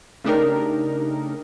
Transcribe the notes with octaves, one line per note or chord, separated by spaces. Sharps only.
C#3 A3 D4 D#4 G4 A#4